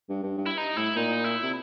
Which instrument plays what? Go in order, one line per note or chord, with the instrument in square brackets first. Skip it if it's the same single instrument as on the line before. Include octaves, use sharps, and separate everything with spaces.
[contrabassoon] G2
G2
G2
[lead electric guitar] E4
D#4
[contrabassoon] A2 [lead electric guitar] E4
[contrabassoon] A#2 [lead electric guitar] D#4
[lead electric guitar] E4
[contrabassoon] C3